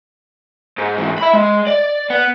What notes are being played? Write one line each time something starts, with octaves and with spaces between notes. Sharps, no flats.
G#2
G#2 E3
E5 B5
G#3
D5
B3